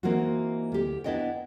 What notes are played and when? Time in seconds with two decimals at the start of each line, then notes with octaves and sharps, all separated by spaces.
0.03 E3 A#3 C4 D#4 F4 F#4
0.72 D2 G4
1.04 B3 D4 E4 D#5 F#5 G5